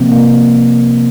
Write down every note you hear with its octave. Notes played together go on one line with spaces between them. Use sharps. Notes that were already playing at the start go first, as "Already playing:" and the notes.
Already playing: C3 F3 A#3 C4
A#3